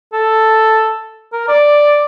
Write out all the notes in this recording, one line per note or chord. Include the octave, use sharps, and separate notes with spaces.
A4
A#4
D5